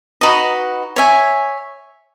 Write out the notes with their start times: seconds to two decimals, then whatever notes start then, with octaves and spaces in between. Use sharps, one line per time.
0.21 D#4 F#4 B4 D#5
0.96 C#5 E5 G#5